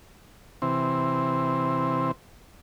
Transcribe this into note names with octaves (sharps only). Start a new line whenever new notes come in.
C3 E3 C4